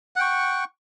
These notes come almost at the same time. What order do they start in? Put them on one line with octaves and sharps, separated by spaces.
F#5 G5 C#6